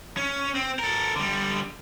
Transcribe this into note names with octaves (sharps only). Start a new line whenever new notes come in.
C#4
C4
A4 A#4
D3 G3